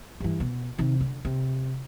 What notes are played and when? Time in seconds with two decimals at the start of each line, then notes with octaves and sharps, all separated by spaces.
0.20 G2 E3
0.40 B2
0.78 C3 D#3
1.01 D3
1.25 C3